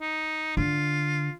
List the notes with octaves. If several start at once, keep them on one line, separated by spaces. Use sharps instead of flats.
D#4
D3 F4